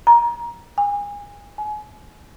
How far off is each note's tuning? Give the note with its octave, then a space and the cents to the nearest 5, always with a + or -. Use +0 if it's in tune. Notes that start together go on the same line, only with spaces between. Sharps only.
A#5 +20
G#5 -30
G#5 +30